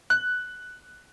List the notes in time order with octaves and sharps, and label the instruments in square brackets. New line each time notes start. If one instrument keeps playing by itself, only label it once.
[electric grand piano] F#6